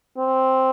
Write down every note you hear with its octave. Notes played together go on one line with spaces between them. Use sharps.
C4